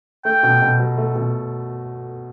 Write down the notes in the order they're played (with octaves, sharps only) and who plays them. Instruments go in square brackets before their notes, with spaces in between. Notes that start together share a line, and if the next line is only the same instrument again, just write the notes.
[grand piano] A3 [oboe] G5
[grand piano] B2
B2
F#3
A3
B2